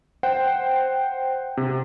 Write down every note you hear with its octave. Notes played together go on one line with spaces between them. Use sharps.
C5 F#5 G5
C3